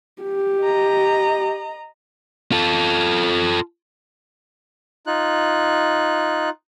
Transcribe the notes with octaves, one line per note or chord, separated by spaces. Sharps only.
G4
D#5 A#5
F4 A4
D#4 F4 F#6